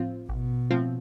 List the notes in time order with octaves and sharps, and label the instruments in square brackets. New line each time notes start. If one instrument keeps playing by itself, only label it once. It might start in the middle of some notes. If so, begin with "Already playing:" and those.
Already playing: [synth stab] A2 F3 C4 F4
[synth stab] A1 [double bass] B2
[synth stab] A2 F3 C4 F4